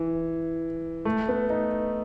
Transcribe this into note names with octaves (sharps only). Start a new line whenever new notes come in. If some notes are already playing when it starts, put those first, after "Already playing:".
Already playing: E3
A3
B3
D#4